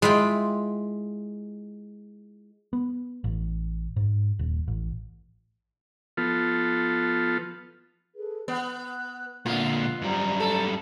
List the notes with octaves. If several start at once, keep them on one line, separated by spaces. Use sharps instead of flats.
G#3 E4 F4 G5
B3
A1
G#2
D#1
A1
F3 B3 F4 A4
G#4 A4 B4
B3 F#6
A#2 D3 B3 F4 E5 F#5
D#5 F#6
F#2 G3 C5 D5 A#5
A4